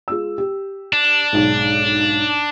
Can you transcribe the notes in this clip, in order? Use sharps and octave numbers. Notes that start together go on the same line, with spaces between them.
G#3 F4 E6
G4
D4
B1 G#2